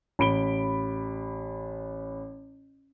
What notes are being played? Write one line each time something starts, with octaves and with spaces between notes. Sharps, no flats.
A1 B5 D7 G7